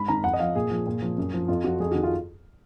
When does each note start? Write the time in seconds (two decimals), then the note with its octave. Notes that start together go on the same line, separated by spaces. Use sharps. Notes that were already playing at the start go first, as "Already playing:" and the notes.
Already playing: G#2 B5
0.08 D#3 A#5
0.24 F2 F#5
0.33 D#5
0.40 F3 F5
0.55 A#2 G#4
0.71 F3
0.86 A#2
1.02 F3
1.18 F#2
1.34 F3
1.48 F2 F4
1.64 F3 F#4
1.80 F2 G#4
1.92 D#3 F#4
2.03 F4